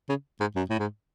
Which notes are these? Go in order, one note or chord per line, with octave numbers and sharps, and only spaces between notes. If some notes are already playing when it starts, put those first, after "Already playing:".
C#3
G#2
F#2
A2
G#2